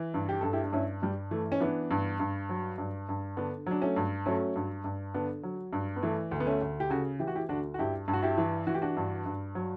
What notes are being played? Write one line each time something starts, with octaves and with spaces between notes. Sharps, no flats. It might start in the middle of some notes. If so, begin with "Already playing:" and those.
Already playing: E3
G2
G4
G2 A4
E4 G4
D4
G2 C#4 E4
G2 G3
E3 A3
C#4
E3 B3 D4
G2
G2
F#3
G2
G2
D3 B3 D4
F#3 D4
A3 C#4
G2
F#3 A3 C#4
G2
G2
D3 B3 D4
F#3
G2
B3
E3 A3
D2
B3
A3 C#4
D2
G4
C#3 F#4 A4
E3 G4
F#4
E4 G4
D2 D4 F#4
F#4
G2 E4 G4
G2
F#4
E4 G4
E3
E3 F#4
G4
D4 F#4
G2
G2
F#3